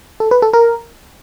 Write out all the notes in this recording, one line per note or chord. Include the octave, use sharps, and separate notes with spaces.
A4
B4
A4
A#4